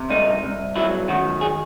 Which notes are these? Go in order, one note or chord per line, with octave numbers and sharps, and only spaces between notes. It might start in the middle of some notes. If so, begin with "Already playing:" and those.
Already playing: C3
C2 D#4
C2
F#3 E4
D#3 F#4
G#4